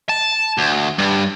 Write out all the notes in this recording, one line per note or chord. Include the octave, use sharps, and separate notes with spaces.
A5
D2
G2